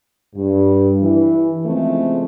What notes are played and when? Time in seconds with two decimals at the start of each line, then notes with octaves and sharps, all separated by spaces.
0.36 G2
1.01 E3
1.66 C#3 F3 G#3 A3 C4